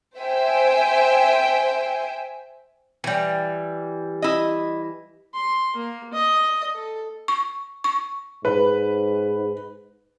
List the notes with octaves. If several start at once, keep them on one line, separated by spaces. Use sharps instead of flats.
C5 E5 G5 G#5
E3 G3
E4 D#5
C6
A#3
D#5
A4
C#6
C#6
G#2 B4